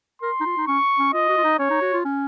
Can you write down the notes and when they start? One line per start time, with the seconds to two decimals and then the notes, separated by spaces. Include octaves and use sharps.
0.22 A#4 C6
0.41 D#4
0.46 F4
0.57 D#4
0.67 C#4 C#6
0.99 C#4
1.13 F4 D#5
1.29 F#4
1.37 F4
1.44 D#4
1.59 C#4 C#5
1.70 D#4
1.81 F#4
1.93 F4
2.05 C#4